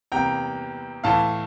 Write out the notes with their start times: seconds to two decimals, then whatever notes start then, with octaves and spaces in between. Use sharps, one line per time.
0.12 E2 C3 G3 A#3 G5 A#5
1.04 A2 E3 A3 F5 A5